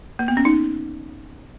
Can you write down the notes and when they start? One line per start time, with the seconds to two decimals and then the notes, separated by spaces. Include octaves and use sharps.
0.19 A#3
0.28 B3
0.37 C#4
0.45 D#4